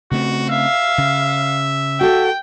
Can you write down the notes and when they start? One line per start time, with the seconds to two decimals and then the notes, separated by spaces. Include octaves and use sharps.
0.11 C#3 A3 C4 F#4
0.50 E5 F5
0.98 C#3
2.01 F#4 A4 G5